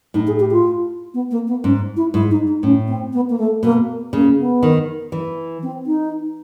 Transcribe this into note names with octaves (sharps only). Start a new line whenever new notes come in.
A2 D#4
G#4
G4
F4
B3
A#3
B3
G#2 C#4
E4
G#2 E4
D#4
D#4
A2 C#4
C4
B3
A#3
A3
B2 A#3
C#3 A#3
B3
D#3
E3
C4
D#4